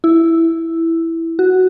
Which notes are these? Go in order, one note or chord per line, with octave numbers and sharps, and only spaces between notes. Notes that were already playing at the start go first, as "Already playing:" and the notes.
E4
F#4